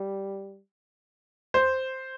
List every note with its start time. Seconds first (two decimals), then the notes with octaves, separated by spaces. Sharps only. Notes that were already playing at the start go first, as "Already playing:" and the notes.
Already playing: G3
1.54 C5